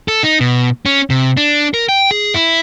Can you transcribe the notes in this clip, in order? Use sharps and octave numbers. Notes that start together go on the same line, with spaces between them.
A4
D#4
B2
C#4
C3
D4
A#4
G5
G#4
E4